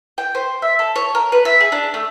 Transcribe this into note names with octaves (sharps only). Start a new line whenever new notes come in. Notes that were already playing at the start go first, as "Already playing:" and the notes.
G5
C5
E5
A4
C#5
A#4
B4
E5
G#4
D4
A3